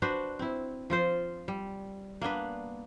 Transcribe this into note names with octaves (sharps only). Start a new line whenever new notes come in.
D4 F#4 B4 C5
C4 E4
F3 F4 C5
G3
A#3 B3 D4 B4